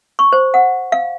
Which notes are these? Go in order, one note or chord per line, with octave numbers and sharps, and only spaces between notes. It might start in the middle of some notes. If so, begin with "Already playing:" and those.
C#6
C5
F#5
F5